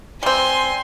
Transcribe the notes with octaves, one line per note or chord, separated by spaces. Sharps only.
G3 C4 G#5 C6